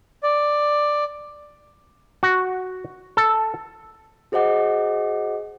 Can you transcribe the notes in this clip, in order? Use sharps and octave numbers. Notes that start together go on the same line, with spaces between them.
D5
F#4
A4
F#4 G#4 C5 D#5 F#5 D6